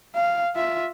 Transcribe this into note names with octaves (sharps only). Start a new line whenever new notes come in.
F5
F4 E5